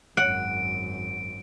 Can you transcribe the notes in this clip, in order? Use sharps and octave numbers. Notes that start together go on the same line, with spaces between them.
G#1 F#2 F#5 D7